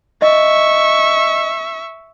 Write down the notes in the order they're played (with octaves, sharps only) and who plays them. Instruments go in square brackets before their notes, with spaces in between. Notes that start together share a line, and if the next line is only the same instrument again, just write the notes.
[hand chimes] D#5 [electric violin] E5 C#6